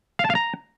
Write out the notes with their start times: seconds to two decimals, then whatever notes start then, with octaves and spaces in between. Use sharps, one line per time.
0.19 F5
0.25 A5
0.30 F5
0.35 A#5